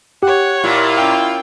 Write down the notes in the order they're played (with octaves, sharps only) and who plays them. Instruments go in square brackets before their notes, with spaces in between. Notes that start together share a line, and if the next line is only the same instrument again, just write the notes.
[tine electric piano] G4 [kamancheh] C#5 F#5
[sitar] A#2 [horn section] E4 F4
[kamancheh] C#4 G5